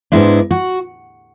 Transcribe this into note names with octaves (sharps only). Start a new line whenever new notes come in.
G#2 G#3 B3 D4 E4
F#4